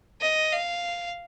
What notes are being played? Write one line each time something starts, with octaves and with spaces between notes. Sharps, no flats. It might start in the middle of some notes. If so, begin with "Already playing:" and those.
D#5
F5